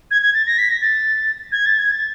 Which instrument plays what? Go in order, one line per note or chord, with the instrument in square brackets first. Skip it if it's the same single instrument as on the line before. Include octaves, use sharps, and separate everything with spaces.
[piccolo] G#6
G#6
A6
A#6
B6
A#6
A6
G#6
A6
G#6
A6